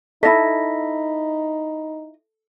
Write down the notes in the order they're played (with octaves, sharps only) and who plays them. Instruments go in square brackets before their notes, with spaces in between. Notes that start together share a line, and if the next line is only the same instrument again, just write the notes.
[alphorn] D#4 [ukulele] E4 D#5 [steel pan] A4 [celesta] B5 A#6 B6